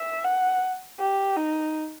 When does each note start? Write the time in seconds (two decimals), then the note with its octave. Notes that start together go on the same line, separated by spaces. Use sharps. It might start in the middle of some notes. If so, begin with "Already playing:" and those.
Already playing: E5
0.24 F#5
0.99 G4
1.36 D#4